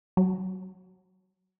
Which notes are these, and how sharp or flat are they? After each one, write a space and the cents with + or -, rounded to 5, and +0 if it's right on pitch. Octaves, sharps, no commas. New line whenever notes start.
F#3 +25